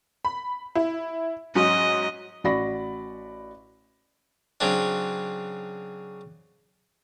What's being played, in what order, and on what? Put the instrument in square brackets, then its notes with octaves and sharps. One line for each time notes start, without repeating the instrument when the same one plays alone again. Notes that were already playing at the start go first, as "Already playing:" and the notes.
[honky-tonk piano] B5
E4
[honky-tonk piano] G#2 F#3 C#4 [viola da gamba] D#5
[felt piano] A1 F#4 D5 B5 A#6
[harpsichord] C#3 F#3 C4 D4